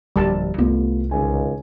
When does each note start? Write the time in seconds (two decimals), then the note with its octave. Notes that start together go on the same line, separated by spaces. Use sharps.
0.16 D1 A#1 F3 G3 A5
0.58 C2 A3 B3 F4
1.11 G#1 C#2 G#5